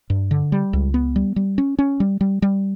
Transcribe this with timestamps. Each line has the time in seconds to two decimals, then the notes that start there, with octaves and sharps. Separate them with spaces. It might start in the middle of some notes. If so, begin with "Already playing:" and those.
0.10 G2
0.31 D3
0.52 G3
0.73 C#2
0.94 B3
1.16 G3
1.36 G3
1.58 C#4
1.79 C#4
2.00 G3
2.21 G3
2.42 G3